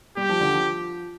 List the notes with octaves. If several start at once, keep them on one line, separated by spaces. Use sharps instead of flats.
G3 G4
F3
D3
F3